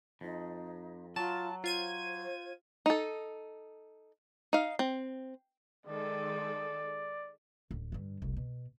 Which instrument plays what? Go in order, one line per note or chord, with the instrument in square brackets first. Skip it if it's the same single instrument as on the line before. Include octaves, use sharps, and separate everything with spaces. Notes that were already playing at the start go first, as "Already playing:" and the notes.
[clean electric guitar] F2 [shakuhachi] D#4
[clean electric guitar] F#3 [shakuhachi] F4 [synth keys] A5
[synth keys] F4 G#6 D#7 [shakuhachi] C5
[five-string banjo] D#4 A4
D#4 F5
C4
[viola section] D#3 G#3 A4 [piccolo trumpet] D5
[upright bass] D1
G2 D3
F1 C2
B2